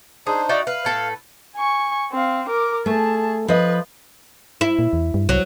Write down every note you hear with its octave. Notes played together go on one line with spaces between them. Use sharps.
D4 D#4 G#4 C5
D#4 F#4 D5 E5 F#5
B4 F5
A2 A4 B4
G#5 C#6
C4 F5
A#4 D6
A3 G#4 A5
F3 B4 D#5
E4
A#2
E2
G2
C2 F#3